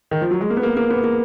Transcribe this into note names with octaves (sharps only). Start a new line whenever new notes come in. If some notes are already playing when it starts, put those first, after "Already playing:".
D#3
F3
F#3
G#3
A#3
B3
A#3
A#3
B3
A#3